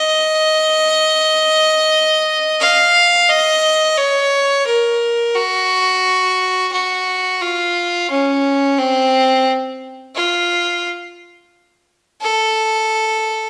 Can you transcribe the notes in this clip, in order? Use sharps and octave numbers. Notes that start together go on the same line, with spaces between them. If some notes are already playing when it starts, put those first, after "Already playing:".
Already playing: D#5
F5
D#5
C#5
A#4
F#4
F#4
F4
C#4
C4
F4
A4